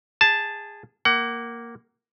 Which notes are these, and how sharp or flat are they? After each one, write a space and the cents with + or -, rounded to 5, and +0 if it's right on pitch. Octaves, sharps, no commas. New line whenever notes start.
G#4 -20 A5 +0
A#3 +0 F#5 +30